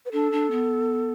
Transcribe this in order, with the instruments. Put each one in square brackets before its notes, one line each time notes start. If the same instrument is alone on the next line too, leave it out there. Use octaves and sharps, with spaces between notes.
[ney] B4
[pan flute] D4 [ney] A4
[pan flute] D4
B3